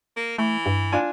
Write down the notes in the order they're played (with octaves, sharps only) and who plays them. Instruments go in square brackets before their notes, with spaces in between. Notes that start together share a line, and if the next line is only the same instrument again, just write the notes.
[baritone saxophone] A#3
[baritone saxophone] E3 [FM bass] A3
[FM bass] G2
[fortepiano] D4 F4 G#5